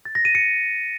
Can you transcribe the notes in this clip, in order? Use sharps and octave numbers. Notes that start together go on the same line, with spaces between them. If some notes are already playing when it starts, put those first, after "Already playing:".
A6
A#6
D#7
C#7